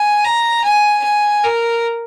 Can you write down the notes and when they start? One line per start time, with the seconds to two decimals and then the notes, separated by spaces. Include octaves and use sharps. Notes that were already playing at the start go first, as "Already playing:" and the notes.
Already playing: G#5
0.24 A#5
0.64 G#5
1.03 G#5
1.44 A#4